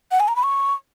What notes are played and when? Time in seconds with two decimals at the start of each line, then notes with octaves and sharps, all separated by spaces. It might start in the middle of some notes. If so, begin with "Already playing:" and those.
0.11 F#5
0.20 G#5
0.28 A#5
0.36 B5
0.43 C#6